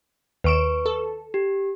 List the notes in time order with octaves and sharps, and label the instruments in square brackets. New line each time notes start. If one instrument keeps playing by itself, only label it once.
[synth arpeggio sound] D#2 D7 E7 [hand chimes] B4 C#6
[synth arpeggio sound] A4
[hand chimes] G4